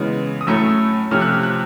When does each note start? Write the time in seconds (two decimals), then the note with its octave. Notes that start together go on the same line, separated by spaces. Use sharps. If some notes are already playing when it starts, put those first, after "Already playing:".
Already playing: C#3 E3 G#3 B3
0.41 D#6
0.47 A2 F#3 A3 C#4 E6
1.11 C3 F3 A3 C#4 F6
1.22 F#6
1.32 F6
1.43 F#6